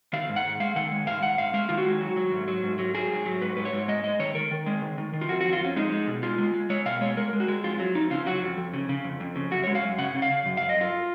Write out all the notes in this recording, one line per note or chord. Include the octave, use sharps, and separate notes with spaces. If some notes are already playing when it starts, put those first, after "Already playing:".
D#3 F5
G#2
F#5
G#2
G#3 F5
D#3 F#5
G#3
G#2 F5
G#2 F#5
G#2 F5
G#3 F5
D#3 F4
F#4
G#3
F#3
F#3
G#2
F#3
G#2
F#3
F#3 G#4
G#2
F#3
G#2 B4
G#2 B4
C#5
G#2
G#3 D#5
G#3 D#5
D#3 C#5
D#3 A#4
D#3
G#3
D#3
D#3
D#3
F4
F2 F#4
F#4
F2
F4
F2 C#4
G#3 D#4
G#3
B2
G#3 F4
G#3
G#3
G#3 C#5
B2 F5
G#3 C#5
G#3 A#4
G#3
F#4
G#3
F2 F4
F#3
F2 D#4
C#3 F4
F#3 F#4
F2
F2
C#3
C#3
F2
F2
C#3
F#2 F#4
C#5
G#3
F5
F#2
C#3 F#5
C#3
F5
C#3
F#2
F5
F#2
D#5
F#2 F4